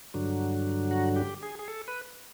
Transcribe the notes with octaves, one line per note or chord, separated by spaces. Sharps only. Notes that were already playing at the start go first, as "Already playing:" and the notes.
G2 D3 F#3
F#4
G4
G#4
G#4
A4
B4